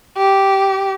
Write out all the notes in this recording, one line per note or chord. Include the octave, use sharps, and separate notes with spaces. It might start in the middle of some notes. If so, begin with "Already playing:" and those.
G4